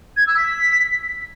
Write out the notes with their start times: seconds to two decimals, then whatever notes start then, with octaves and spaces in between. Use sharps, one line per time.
0.17 G#6
0.27 E6
0.37 B6